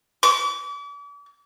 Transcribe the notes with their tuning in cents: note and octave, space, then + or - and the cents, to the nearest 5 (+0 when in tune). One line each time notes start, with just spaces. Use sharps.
D6 -40